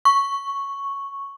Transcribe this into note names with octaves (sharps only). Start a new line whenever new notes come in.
C#6